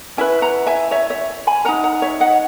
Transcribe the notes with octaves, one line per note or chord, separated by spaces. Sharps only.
C#4 E4 B4 E5 G#5
F#5 A#5
E5 G#5
C#5 E5
C#5 E5
G#5 B5
D#4 A#4 F#5 A#5
F#5 A#5
C#5 E5
D#5 F#5